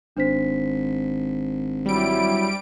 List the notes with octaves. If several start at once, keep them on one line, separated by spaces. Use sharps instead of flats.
G#1 D4 C5 B6
F#3 G3 E4 D7